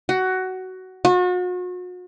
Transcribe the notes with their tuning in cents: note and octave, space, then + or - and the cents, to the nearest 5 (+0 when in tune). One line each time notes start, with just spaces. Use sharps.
F#4 +15
F#4 -40